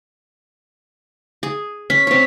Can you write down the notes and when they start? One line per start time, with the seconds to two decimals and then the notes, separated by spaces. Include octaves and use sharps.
1.43 G#4
1.90 C#4 B6
2.07 C4 C#5